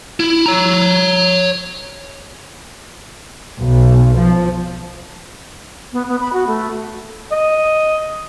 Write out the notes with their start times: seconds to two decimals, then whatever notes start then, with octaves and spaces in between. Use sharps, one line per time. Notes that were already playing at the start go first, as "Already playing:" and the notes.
0.20 E4
0.46 C#5 A#5
3.58 B1
4.18 F3
5.93 B3
6.09 B3
6.20 B5
6.33 F#4
6.47 A3
7.32 D#5